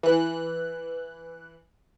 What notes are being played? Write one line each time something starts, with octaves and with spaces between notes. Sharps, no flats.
E3 F#6